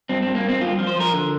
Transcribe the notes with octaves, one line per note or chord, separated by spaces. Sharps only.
G2 C4
G2 C4
A#3
G2 C4
G2 F4
F3
C5
F3 A#4
D3